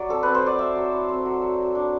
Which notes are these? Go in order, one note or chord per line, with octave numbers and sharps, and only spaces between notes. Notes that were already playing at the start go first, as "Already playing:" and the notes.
Already playing: F#3 D5
C4 A4
C4 B4
C5
F#3 D5
C4 E5
F#3
E4
C4
F#3
F#3
F#3
D4